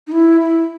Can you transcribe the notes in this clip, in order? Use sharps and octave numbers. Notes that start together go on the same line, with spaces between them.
D#4
E4
E4